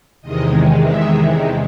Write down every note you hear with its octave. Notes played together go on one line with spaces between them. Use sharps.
E2 C3 D#3 G#3 D#5
E5